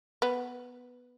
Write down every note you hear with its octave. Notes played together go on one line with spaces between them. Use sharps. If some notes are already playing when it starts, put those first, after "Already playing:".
B3